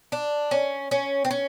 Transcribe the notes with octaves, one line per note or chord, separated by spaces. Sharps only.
D4
C#4
C#4
C4
C#4